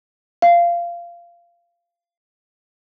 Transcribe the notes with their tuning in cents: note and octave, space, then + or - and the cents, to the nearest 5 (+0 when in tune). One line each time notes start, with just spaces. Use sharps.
F5 -20